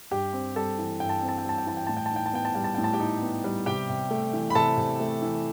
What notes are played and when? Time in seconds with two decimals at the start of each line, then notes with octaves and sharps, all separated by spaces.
0.11 G2 G4 G5
0.33 C4
0.56 G3 A4 A5
0.79 E3
1.00 G2 G5
1.09 A5
1.19 C4 G5
1.29 A5
1.38 G5
1.45 G3 A5
1.58 G5
1.67 E3 A5
1.77 G5
1.87 A2 A5
1.97 G5
2.06 A5
2.11 D#4 G5
2.26 A5
2.33 B3 G5
2.45 A5
2.55 G3 G5
2.64 A5
2.75 A2 G5
2.84 A5
2.93 G4 G5
3.00 D#4
3.22 B3
3.44 G3
3.66 C3 G4 G5
3.90 C3
4.11 A3
4.33 E3
4.50 B5
4.55 C3 A4 A5
4.77 C3
5.00 A3
5.22 E3